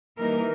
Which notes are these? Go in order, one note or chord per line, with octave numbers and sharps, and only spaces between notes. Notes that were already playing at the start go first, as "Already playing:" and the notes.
E3 G3 A#3 D#4 A#4